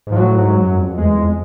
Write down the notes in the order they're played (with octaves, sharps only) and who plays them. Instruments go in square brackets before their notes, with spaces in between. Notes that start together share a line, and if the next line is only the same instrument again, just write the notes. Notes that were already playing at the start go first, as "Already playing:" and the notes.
[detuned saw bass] G#2
[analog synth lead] F3
[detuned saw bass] A2 [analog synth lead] F#3
[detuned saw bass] G#2
F#2
F2
[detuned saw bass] E2 [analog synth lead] G#3
[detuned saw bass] F2